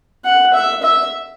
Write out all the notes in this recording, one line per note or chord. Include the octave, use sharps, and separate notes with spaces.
F#5
E5
E5